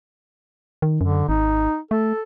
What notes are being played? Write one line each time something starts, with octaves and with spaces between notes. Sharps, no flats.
D#3
F#2 D3
G#1 D#4
A3 A4